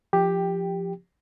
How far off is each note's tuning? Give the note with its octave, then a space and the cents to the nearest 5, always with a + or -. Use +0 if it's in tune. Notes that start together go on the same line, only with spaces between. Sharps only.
F3 +0 G4 +10 G5 +0